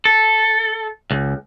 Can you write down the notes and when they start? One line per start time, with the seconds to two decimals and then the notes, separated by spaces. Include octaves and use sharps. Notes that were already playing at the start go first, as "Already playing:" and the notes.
0.05 A4
1.11 C#2